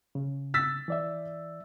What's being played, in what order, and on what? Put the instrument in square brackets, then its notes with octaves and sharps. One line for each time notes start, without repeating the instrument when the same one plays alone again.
[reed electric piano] C#3
[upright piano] E6 A6 B6
[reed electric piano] E3 D5 E5